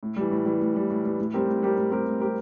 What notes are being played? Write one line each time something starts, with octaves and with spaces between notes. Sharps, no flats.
A2
E3 G3
A2
E3 G3
A2
E3 G3
A2
E3 G3
A2
G3 C4 G4 A#4
A2
G3 C4 G4 A#4
A2
G3 C4 G4 A#4
A2
G3 C4 G4 A#4